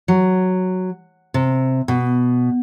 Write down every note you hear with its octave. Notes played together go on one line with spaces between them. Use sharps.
F#3
C3
B2